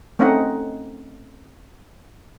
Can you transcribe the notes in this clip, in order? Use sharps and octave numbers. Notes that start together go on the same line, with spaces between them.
A3 C4 C#4 D#4 D#5 F#5